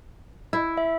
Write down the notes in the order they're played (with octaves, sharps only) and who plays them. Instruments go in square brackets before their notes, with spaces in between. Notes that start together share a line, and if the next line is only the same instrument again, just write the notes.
[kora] E4
[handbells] E5